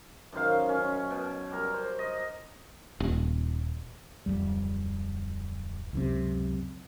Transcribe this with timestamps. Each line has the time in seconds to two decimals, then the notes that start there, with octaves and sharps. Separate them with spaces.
0.32 F#2 D#3 C5 F5
0.69 C#4
1.10 B2
1.51 G3 A#4
1.74 C5
1.99 D#5
3.00 D#1
4.26 D1 B1 F2 G3
5.93 C#2 F#2 C3